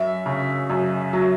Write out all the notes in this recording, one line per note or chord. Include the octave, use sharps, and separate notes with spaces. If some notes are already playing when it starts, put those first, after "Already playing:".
Already playing: F#2 E5
C#3
F#2
F#3